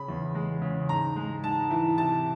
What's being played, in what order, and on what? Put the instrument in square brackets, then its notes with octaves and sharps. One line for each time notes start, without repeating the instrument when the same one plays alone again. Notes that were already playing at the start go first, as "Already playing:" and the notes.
Already playing: [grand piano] C#3 B5
E2
G#3
C#3
G#2 A#5
G#3
G#2 A5
E3
C3 A5